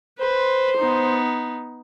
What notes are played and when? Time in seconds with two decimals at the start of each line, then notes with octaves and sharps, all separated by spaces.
0.20 B4 C5
0.78 B3 D#4